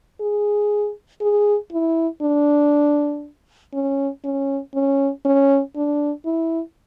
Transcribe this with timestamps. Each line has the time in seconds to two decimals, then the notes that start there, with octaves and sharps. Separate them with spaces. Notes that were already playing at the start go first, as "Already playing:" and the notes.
0.21 G#4
1.21 G#4
1.72 E4
2.22 D4
3.73 C#4
4.24 C#4
4.75 C#4
5.25 C#4
5.76 D4
6.25 E4